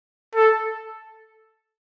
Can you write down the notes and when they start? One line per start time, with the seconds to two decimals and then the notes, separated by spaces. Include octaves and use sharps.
0.35 A4